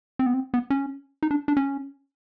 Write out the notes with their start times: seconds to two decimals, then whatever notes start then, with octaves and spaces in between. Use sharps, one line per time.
0.19 C4
0.26 B3
0.34 C4
0.54 B3
0.70 C#4
1.23 D#4
1.31 D4
1.48 D4
1.57 C#4